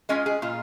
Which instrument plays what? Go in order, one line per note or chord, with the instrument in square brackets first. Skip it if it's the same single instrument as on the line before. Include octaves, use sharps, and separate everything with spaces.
[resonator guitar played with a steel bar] G#3 C#4 F4 D#5 G#5
G#4
A#2 F4